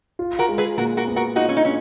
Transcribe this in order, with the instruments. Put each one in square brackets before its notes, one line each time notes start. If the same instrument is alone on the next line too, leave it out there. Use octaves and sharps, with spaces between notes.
[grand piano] F4
[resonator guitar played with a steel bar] F#4 A#4
[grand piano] G#3
[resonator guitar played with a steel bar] G#4 B4
[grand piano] A#2 [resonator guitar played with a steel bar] F#4 A#4
[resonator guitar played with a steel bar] F#4 A#4
[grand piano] B3
[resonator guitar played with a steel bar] F#4 A#4
[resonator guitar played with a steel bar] D#4 F#4 [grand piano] F4
[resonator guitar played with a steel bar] C#4
D#4
C#4